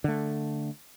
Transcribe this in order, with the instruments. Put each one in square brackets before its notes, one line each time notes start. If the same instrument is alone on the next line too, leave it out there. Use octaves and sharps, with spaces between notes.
[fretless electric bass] D3 A3